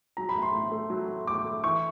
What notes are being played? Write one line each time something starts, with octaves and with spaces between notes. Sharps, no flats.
F#3 A#5
B5
A2
C6
A2
A3
F#3
A2
A2 D6
A3
E3 C#6